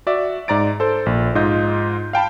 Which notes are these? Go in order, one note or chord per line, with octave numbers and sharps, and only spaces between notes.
F#4 D5 E5
G#2 D5 A#5 A6 D7
A4 C5
A#1
G#2 F4 D#5 G6
F5 G5 A5 B5